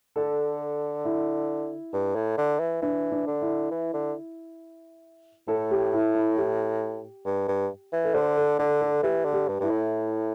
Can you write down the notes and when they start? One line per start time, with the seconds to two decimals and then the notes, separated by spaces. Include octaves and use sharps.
0.16 D3 A4
1.05 E4
1.93 G2
2.15 A2
2.38 D3
2.60 E3
2.82 E3 D4
3.11 D4
3.27 D3
3.42 E4
3.71 E3
3.93 D3
5.48 A2 A4
5.71 G4
5.93 E4
6.15 E4
6.37 G4
7.25 G2
7.48 G2
7.93 E3
8.04 A4
8.14 D3 C5
8.37 A4
8.59 D3 A4
8.81 A4
9.03 E3 G4
9.25 D3
9.33 G4
9.48 G2
9.60 G2 E4
9.70 A2